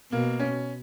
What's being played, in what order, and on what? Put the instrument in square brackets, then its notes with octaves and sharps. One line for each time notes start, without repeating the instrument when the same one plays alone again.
[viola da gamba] B2 [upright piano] A#3
[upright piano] C#4